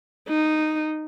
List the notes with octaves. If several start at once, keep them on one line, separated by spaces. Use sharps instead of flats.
D#4